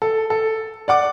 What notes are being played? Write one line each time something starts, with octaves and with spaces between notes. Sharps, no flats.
A4
A4
D5 F#5 D6